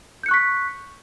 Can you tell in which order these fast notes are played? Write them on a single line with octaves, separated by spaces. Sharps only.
G6 C#7 F#6 C#6 B6